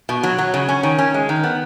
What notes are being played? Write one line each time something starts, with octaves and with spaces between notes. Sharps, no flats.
B2
F#3
F#3
C#3
C#4
D#3
C#4
G#3
D#3
B3